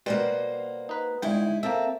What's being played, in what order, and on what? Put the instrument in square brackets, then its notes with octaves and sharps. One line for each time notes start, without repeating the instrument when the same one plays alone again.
[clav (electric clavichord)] B2 G3 [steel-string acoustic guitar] A#3 F#4 C5
[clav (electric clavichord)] D#4 B4
[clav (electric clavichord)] G1 G5 [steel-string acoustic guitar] G#3 D#4 E4
[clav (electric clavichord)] A#3 A4 E5 [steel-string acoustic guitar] C4